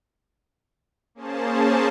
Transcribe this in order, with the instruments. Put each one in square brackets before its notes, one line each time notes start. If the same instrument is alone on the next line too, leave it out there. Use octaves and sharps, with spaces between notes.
[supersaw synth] A#3 C#4 G#4 C5 A5